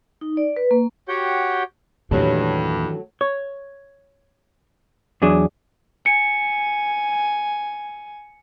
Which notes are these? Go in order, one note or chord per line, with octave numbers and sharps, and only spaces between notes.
D#4
D5
B4
A#3
F#4 G4 C#5 F#5 G5 G6
E2 G2 A#2 D#3 E3 F#3 A3 A4
C#5
E2 F#3 D4 G#4
G#5 C#7